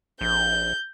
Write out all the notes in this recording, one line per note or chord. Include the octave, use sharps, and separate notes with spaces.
A#1 G6